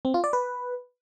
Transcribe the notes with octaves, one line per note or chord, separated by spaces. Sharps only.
C4
F4
D5
B4